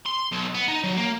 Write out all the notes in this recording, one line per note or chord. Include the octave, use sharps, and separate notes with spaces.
C6
B1
B3
D#4
F#3
A#3